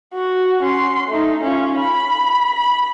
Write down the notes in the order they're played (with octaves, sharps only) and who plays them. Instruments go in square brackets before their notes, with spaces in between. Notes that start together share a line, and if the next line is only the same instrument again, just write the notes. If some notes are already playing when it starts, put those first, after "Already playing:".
[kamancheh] F#4
C#4 C6
A3 D#4
C#4 F4
B5
B5